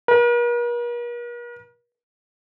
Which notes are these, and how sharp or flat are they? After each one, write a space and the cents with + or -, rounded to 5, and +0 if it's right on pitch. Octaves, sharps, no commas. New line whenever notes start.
A#4 +45